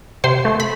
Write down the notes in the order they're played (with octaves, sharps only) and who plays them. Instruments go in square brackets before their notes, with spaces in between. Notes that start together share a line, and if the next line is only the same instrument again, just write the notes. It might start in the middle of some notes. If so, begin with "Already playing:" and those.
[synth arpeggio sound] C3 C5 C6
A3
B5